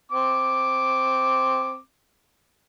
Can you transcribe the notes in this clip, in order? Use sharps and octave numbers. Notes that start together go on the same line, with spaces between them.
C4 D6